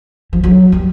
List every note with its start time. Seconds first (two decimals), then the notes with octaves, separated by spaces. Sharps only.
0.33 F3
0.44 F#3
0.72 G3